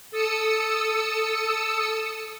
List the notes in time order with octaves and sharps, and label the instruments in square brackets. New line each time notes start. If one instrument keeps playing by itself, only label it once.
[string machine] A4 D#6 E6 C#7